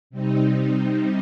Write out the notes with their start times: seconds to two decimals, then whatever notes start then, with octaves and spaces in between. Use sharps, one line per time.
0.10 C3 G3 C4 D#4